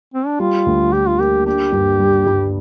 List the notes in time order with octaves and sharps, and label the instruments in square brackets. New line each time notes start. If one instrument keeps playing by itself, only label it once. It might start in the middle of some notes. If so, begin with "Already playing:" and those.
[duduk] C4
D4
[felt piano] G3 [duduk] F4
[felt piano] D2
[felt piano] D3 [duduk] G4
[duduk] F4
[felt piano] A#3 [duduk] G4
[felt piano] D4 [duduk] G4
[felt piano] G2
G3
G2